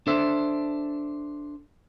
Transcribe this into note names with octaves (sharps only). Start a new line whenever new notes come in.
D4 A4 C5 E5